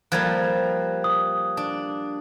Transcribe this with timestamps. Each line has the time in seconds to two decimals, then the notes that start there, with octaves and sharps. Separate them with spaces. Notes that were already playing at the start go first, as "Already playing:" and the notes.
0.12 F3 G3 A#3 F#6 G#6
1.04 D#6
1.57 D4